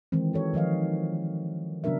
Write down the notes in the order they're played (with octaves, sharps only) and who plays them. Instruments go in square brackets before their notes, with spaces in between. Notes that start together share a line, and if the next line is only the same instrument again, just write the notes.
[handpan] D#3 E3 G#3 C4
F#4 A4 C#5
D#3 F3 D#5 F5
C#3 F#3 B3 D4 A#4 E5